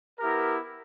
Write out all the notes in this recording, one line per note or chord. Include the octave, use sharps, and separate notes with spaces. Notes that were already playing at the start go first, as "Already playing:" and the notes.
B3 E4 G4 A#4